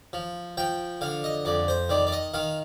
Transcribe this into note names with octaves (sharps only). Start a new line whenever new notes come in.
F3
F3 G5
D3 F5
D#5
F2 D5
C5
D#3 D5
D5
D#5
D#3 F5